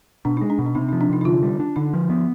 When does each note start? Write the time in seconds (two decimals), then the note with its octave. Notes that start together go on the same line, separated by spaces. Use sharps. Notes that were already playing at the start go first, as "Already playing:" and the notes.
0.25 B2 D4
0.37 G#3 D#4
0.50 D4
0.59 B2
0.66 D4
0.75 C3 D#4
0.89 D#4
0.93 F3
1.01 D4
1.10 C3 D#4
1.21 D#4
1.25 D3 F4
1.43 G3
1.60 D4
1.76 D3 D#4
1.93 F3
2.10 B3